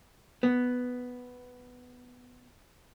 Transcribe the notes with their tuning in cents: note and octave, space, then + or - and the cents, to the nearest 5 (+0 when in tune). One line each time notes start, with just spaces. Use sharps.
B3 +5